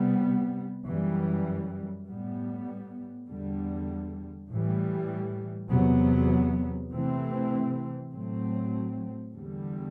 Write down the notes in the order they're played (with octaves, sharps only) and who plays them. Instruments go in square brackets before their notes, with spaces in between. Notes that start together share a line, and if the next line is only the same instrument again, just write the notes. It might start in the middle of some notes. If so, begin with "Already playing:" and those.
Already playing: [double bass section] C3 G3 B3
F#2 E3 G3
A2 G3 B3
E2 D3 G3
A2 E3 G3
E2 C3 F#3 B3
C3 E3 A3 C4
A2 F#3 A3 C4
E2 D3 G3